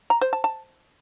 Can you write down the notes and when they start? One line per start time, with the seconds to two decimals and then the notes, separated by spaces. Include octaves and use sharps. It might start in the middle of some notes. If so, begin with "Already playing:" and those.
0.10 A#5
0.21 C5
0.33 A5
0.44 A5